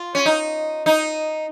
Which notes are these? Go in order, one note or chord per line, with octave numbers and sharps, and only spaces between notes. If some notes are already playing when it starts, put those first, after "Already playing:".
Already playing: F4
C#4
D#4
D#4